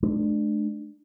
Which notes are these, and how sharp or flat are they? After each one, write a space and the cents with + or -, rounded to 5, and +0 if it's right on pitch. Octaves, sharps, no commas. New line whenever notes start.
A3 -45 D4 +20